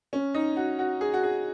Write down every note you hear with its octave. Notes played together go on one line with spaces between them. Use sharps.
C#4
D#4
F#4
F#4
G#4
F#4
G#4